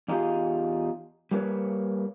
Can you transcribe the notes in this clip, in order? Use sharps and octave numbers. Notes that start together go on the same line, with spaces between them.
E2 D#4 F4 G4 G#4
G3 A#3 F4 B4 C#5